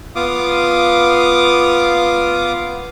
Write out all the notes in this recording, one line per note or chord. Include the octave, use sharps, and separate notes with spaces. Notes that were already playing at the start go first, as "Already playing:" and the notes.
B3 F4 F5 D6 D#6